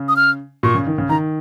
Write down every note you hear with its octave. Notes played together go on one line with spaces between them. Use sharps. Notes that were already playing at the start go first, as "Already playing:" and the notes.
Already playing: C#3
D#6
F6
A#2 C#6
C#3
D#3
C#3
D#3 A#5